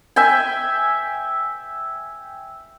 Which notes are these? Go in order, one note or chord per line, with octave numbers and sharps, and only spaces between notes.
E5 G5 G#5